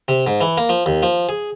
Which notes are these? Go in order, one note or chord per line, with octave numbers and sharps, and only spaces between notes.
C3
G#2
E3
A#3
F3
D#2
F3
G#4